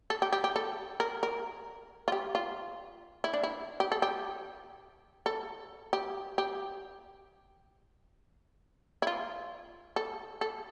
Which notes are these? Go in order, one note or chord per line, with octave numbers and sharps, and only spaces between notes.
A4
G4
G4
G4
A4
A#4
A#4
F4
G4
F4
E4
D4
E4
G4
A4
G4
A4
G4
G4
E4
F4
A4
A4